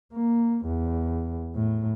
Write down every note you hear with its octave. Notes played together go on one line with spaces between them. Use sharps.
A#3
E2
A2